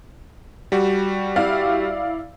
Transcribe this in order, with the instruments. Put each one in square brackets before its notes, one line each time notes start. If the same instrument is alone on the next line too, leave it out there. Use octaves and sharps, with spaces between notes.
[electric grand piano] G3 F#4
[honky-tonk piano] E4 D5 F5